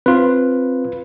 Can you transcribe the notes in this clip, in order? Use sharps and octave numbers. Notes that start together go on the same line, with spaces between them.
C4 F4 B4